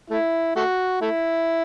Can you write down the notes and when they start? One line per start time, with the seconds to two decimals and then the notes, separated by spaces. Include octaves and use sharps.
0.10 A3 E4
0.56 A3 F#4
1.01 A3 E4